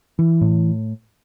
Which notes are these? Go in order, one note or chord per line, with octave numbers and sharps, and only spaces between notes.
E3
A2